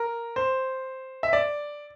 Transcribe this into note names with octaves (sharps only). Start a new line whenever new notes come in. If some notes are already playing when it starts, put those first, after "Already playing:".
Already playing: A#4
C5
E5
D5